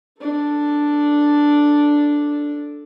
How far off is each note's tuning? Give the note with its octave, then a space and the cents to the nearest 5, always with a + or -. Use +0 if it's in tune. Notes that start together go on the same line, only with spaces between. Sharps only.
D4 +0 A4 +0